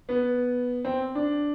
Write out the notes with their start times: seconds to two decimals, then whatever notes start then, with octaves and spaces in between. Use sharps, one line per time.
0.09 B3
0.85 C4
1.15 D4